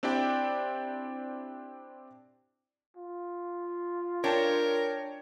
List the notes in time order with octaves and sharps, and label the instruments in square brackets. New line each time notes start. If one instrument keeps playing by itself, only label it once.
[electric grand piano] C4 D4 E4 G4 D5 G5
[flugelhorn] F4
[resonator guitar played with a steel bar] D4 [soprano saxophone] A#4 [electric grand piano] C#5 G5 A5